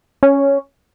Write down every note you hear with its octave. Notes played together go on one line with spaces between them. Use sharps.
C#4